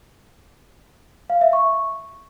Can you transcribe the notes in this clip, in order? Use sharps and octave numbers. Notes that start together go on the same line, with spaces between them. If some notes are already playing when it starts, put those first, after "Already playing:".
F5
E5
C#6